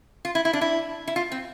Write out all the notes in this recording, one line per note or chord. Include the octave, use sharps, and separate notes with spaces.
F4
E4
E4
D4
E4
E4
F4
C4